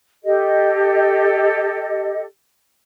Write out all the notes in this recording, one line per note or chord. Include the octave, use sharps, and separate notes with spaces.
G4 A4 D#5